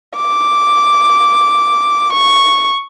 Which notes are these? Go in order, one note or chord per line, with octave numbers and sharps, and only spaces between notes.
D6
C#6